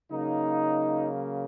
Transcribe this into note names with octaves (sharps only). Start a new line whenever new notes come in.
C#3 F#3 A#3 D#4